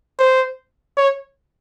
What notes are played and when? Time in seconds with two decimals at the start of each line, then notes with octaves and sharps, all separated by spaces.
0.19 C5
0.97 C#5